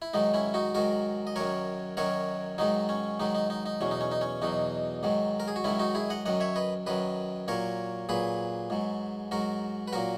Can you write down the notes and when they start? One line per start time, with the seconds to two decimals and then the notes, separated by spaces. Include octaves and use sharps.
0.02 E4
0.13 G#2 D#3 F#3 D#4
0.34 C#4 E4
0.54 D#4 F#4
0.75 G#2 D#3 F#3 F#4 A#4
1.27 D#5
1.36 F#2 D#3 F#3 A#4 C#5
1.97 F#2 D#3 F#3 A#4 C#5
2.58 G#2 D#3 F#3 D#4
2.89 C#4
3.20 G#2 D#3 F#3 D#4
3.35 D#4
3.50 D#4
3.66 D#4
3.81 E2 B2 F#3 C#4
3.91 D#4
4.01 C#4
4.11 D#4
4.21 C#4
4.42 E2 B2 F#3 D#4
5.03 G#2 D#3 F#3
5.40 A#4
5.48 G#4
5.56 F#4
5.64 G#2 D#3 F#3 C#4 E4
5.79 D#4 F#4
5.95 E4 G#4
6.10 D#5 F#5
6.25 F#2 D#3 F#3 D#5 F#5
6.41 C#5 E5
6.56 B4 D#5
6.87 F#2 D#3 F#3 B4 D#5
7.48 A#2 F#3 A#4 C#5
8.09 A#2 F#3 G#4 B4
8.70 G#2 F#3
9.31 G#2 F#3 F#4 A#4
9.88 B4
9.93 A#2 F#3 F#4 A#4